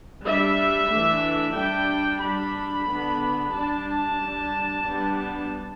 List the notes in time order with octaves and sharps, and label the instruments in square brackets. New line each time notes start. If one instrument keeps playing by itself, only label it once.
[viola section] G3 D4 E5
E3 A3 D4
G3 D4 G5
G3 D4 B5
D3 B3 D4
G3 D4 A5
G3 D4
G3 B3 D4